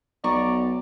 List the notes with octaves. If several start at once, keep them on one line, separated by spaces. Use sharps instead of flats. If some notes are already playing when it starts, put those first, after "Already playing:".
B1 D5 A#5 C#6